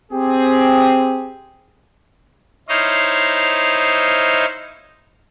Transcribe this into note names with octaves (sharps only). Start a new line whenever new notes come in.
C4 G4 G#4
D#4 E4 C5 C#5 D#5 F5